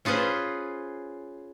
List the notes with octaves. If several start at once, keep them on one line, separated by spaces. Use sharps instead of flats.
C#4 F4 G#4 B4 C5